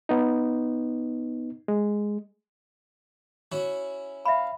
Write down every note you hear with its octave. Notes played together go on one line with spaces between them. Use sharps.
B3 D#4
G#3
C#4 E4 F#4
E5 F5 B5